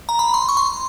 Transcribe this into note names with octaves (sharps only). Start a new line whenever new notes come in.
A#5
B5
C6
C#6
C6